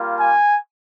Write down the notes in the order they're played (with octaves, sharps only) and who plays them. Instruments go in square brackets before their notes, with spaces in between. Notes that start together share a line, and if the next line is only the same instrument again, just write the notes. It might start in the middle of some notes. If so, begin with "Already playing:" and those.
Already playing: [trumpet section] G3 A#3 F4
G#5